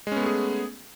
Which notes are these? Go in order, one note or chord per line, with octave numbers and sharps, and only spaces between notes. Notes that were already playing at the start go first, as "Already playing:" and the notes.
G#3 A3 B3 C#4 G#4